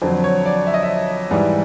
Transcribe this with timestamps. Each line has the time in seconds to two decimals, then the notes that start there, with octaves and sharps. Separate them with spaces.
0.02 F2 D3 F#3 C5
0.24 C#5
0.46 D5
0.67 E5
0.74 D#5
0.83 E5
1.31 G#2 E3 G3